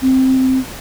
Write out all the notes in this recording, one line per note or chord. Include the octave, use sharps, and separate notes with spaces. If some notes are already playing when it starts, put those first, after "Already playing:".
C4